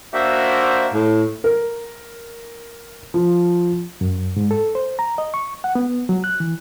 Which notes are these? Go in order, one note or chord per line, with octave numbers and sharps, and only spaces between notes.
A#3 D4 F#4 C5 E5
A2
A#4
F3
F#2
G#2
A4
C5
A#5
D#5
C#6
F#5
B3
F#3
F#6
E3